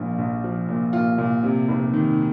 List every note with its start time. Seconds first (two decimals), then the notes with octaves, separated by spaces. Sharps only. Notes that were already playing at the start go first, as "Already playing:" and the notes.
Already playing: A#1 A#2 F3 F4
0.18 A#1
0.44 F3
0.69 A#2
0.93 A#2 F4
1.18 A#2
1.43 C3
1.68 F1
1.94 D#3